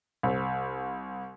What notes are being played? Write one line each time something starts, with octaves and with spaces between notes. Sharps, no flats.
C2